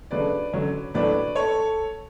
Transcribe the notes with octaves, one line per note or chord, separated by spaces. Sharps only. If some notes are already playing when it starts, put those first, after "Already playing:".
C#3 F#3 A3 D4 B4 D5
D3 F#3 C#4
A2 F#3 A3 D4 B4 D5
A4 C#5